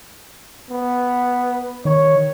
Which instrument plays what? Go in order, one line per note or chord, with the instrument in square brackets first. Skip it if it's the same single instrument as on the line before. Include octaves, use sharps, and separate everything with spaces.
[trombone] B3
[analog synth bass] D#3 [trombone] C#5